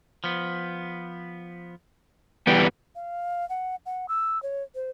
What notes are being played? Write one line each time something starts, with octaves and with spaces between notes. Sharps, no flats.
F3 B3
E3 G3 B3 G5
F5
F#5
F#5
E6
C#5
C5